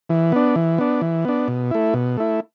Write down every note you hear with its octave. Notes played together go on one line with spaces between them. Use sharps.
E3
B3 D4
E3
B3 D4
E3
B3 D4
B2
A3 E4
B2
A3 E4